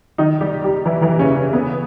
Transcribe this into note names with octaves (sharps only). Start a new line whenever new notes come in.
D#3 D#4
G3 G4
G3 G4
E3 E4
E3 E4
C#3 C#4
C#3 C#4
B3